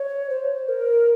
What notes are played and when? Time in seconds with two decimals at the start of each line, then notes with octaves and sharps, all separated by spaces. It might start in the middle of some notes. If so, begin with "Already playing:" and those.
Already playing: C#5
0.30 C5
0.68 A#4